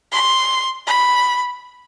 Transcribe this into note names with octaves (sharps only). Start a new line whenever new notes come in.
C6
B5